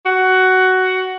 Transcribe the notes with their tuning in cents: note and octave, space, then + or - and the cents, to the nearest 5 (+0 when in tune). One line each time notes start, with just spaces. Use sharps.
F#4 +10